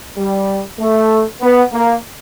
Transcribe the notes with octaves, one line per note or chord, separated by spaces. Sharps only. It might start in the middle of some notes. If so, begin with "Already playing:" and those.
G3
A3
B3
A#3